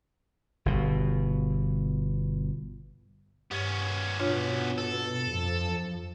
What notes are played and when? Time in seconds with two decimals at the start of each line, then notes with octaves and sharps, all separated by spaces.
0.66 G1 B2
3.51 G2 B3 C#4
4.20 B2 D4 F4 C#5
4.78 A4
5.29 F2 F3